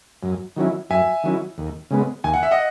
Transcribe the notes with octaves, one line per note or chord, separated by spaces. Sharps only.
F#2
D#3 F#3 C#4 E4
F#2 E5 G#5
D#3 F#3 C#4 E4
D#2
C#3 G#3 B3
D#2 G#5
F#5
E5
D#5 F#5